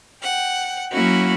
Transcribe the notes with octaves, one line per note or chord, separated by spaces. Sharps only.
F#5 G5
F#3 A#3 C#4 E4 F#4